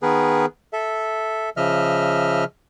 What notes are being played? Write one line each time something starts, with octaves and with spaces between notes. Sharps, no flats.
D#3 B3 G#4 A#4 B4
A4 E5
C#3 F3 D#5 E5 F6